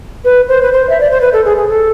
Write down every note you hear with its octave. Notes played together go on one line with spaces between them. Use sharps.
B4
C5
B4
C5
E5
D5
C5
B4
A4
G#4
G#4
A4